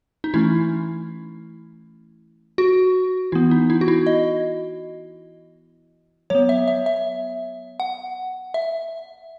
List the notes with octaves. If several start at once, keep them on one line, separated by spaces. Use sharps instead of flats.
D#4
E3 A3 C#4 E4
F#4
E3 B3 E4
D#4
E4
F#4
E4
D#5
F#3 B3 C#5
E5
E5
E5
F#5
E5